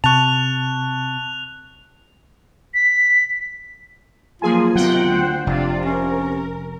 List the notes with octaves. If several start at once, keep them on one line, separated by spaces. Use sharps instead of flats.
C3 A5 C#6 F#6 F7
B6
F3 F#3 A#3 F4 G#4 G#5
C3 D#3 F#3 B3 A#4 F#5 G5
D2 C5
F1 C3 D4 F4 D5
C#4 A#4